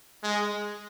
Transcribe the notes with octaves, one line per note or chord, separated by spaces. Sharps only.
G#3